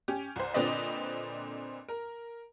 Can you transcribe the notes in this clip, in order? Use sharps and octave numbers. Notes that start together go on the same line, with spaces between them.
C#4 G4
C2 C5
A#2 D3 C4 B4 D5 D#5
A#4